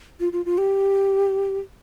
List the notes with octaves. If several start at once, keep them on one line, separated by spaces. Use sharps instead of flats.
F4
F4
F4
G4